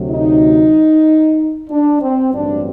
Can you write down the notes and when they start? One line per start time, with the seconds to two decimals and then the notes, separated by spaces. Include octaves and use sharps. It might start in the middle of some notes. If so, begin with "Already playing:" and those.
Already playing: D2 C3 F#3
0.11 D#4
1.70 D4
2.02 C4
2.34 A1 G2 F#3 C4 D4